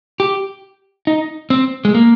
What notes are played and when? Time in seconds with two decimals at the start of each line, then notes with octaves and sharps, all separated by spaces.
0.20 G4
1.07 D#4
1.50 C4
1.85 G#3
1.95 A#3